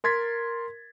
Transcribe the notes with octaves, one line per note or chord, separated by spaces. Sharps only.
A#4 C6 G#6 A6 B6